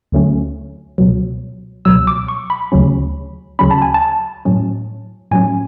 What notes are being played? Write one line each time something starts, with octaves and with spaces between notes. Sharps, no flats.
D2 D3 F#3 A3 C#4
C#2 B2 F#3
C#2 B2 F#3 E6
D6
C#6
B5
D2 C#3 F#3 C#4
D2 C#3 F#3 C#4 B5
A5
G#5
A5
A2 F#3 C#4
A2 F#3 C#4 G#5